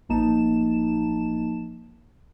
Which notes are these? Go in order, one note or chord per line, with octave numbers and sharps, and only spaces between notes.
A1 F3 A#3 D#4 A5 E7